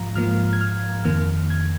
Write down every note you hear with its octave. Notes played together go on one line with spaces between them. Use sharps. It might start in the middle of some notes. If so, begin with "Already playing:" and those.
Already playing: G#2 F3 F5 A#5
G#2 F3 A#3 F6
G#6
F6
F2 D#3 A#3 F6
G#6